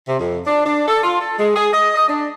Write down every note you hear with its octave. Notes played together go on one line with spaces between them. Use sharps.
C3
F2
D4
D4
A4
F4
A4
G#3
G#4
D#5
D#5
D4